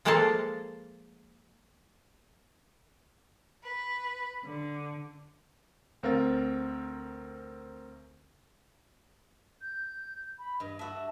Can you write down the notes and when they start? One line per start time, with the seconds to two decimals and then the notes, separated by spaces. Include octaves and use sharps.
0.05 F3 G#3 A#3 A4 F5 A5
3.62 B4
4.43 D3
6.03 D2 C4 A#4 F5 A6
9.61 G6
10.39 B5
10.60 G2 D#5
10.79 F#4 E5 A5